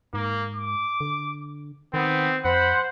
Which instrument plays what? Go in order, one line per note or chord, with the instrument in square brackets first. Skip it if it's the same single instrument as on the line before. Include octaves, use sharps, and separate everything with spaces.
[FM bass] G#2 [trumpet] A#3
[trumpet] D6
[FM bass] D3
[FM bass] D#3 [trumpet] B3 [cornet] C4
[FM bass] F2 [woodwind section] C5 [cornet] F#5 [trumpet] B5